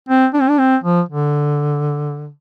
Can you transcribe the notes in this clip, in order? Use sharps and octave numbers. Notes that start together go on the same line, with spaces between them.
C4
D4
C4
D4
C4
F3
D3